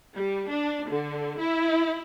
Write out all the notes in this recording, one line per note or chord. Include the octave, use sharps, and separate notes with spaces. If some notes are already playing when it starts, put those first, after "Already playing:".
G3
D4
D3
E4